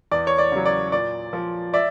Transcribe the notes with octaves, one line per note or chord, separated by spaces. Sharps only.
E2 D5
C#5
D5
C#3 F#3
D5
A#2 D5
F3
D5 E5